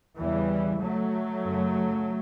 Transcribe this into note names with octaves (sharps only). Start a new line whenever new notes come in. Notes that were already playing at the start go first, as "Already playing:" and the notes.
E2 C#3 E3 G3
F#3 A3
F#2 C#3